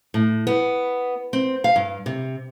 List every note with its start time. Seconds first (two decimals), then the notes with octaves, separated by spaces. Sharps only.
0.14 A2
0.47 B3
1.33 C4
1.64 F5
1.76 G2
2.06 C3